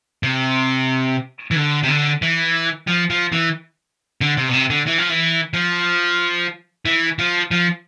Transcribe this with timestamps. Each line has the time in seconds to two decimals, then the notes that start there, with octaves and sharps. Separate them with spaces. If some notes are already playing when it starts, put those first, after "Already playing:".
0.23 C3
1.51 E3
1.56 D3
1.83 C3
1.89 D3
2.22 E3
2.88 F3
3.10 F3
3.32 E3
4.21 D3
4.37 C3
4.49 B2
4.53 C3
4.70 D3
4.87 E3
4.98 F3
5.09 E3
5.53 F3
6.86 E3
7.19 F3
7.51 F3